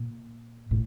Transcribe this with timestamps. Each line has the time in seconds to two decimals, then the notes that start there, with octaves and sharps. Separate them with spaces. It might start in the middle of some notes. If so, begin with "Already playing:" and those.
Already playing: A#2
0.71 A2